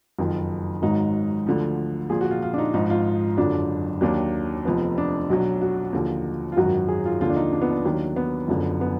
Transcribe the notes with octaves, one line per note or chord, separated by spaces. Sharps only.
F#1 F2 D#3
G#1 G#2 D#3 F#3 D#4
D2 D3 F3
A#1 A#2 F3 G#4
F#4
F4
F4
D4
D#4
G#1 G#2 F3 D#4
F4
F#1 F2 D3 F#3 D4
D#2 D#3 F#3 D4
F1 F2 F3 B3
D4
B1 B2 F#3
F#4
D#2 D3 F3
F4
G#1 F#2 D#3 F#3 F#4
G#4
F4
D#2 D3 F3 F4
D4
D#4
D4
B3
D4
D#2 D#3 F#3
B3
F#1 F#2 D3 F3
B3